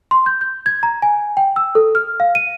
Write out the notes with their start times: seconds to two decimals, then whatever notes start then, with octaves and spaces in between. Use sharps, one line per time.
0.11 C6
0.26 G6
0.41 G6
0.66 G#6
0.83 A#5
1.02 G#5
1.37 G5
1.56 E6
1.75 A4
1.95 F6
2.20 F5
2.35 D#7